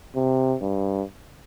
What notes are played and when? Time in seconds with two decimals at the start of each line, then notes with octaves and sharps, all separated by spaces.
0.16 C3
0.62 G2